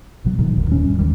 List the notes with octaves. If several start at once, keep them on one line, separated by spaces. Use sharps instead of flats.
A#1 B2 F#3
A#2 D3 D#3 F#3
E1 D2 G2 D#3
D#2 G3 C#4
G2
D#2 D#3 G3